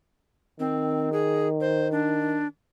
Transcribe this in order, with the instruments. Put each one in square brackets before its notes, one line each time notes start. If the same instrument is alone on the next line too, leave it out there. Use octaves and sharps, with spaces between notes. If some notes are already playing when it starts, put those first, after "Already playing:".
[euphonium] D#3 [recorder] C4
[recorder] G#4
C5
D4